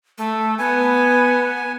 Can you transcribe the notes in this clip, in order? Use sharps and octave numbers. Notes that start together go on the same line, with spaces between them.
A3
B3 G#5